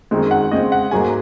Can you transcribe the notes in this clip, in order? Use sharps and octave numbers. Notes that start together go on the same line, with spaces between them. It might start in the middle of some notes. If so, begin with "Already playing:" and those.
F#2 D#3 G#3 C4 D#4
F#5
C#3 G#3 C4 D#5
F#5
G#2 F#3 A#3 G#5